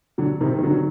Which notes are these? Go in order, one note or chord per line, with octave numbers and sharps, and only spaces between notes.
D3 F#3
C3 D#3
D#3
D3 F#3